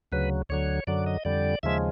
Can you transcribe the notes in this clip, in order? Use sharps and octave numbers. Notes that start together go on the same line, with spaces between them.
D2 C#3 F#3 B4
D2 D3 F#3 C#5
F#2 D3 F#3 D5
D#5
F2 D3 G3 D5
D#2 C#3 F3 G#3 E5